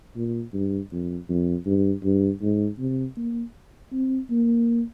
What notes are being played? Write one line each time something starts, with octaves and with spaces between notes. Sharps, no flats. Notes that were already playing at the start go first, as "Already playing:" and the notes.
A#2
G2
F2
F2
G2
G2
G#2
C3
A#3
C4
A#3